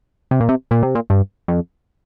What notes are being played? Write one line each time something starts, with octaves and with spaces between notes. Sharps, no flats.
C3
A#2
C3
A#2
C3
A#2
G2
F2